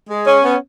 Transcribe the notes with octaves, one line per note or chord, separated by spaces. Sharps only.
G#3
C#4
B3